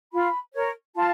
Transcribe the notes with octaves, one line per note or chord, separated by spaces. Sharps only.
F4 B5
A#4 C#5
F4 A5